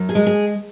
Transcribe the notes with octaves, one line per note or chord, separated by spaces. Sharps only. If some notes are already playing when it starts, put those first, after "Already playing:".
Already playing: F#2
G#4
G#3
G#4